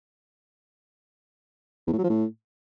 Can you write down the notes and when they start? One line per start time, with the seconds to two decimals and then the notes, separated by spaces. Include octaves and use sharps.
1.87 E2
1.93 A2
1.98 F#3
2.04 F3
2.09 A2